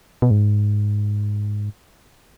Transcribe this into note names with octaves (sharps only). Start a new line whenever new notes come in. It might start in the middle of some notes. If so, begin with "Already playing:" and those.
B2
G#2